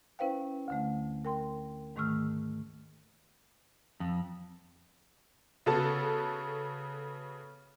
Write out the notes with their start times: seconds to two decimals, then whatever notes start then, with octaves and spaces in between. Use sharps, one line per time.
0.19 C#4 E4 B4 C5 F5 G5
0.68 D2 D3 A3
1.25 A#4 G5 C6
1.96 G#2 D#3 A3 C#6 E6 F6
4.00 F2
5.66 C#3 B3 F#4 A4 A5